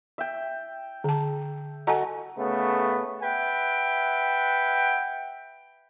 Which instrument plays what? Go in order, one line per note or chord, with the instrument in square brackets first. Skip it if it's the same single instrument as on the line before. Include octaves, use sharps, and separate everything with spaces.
[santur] E5 G5
[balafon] D3 A5
[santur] F#4 A4 A#5 [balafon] D#5 G#5
[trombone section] C#3 A3 B3
[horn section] B4 E5 F#5 G5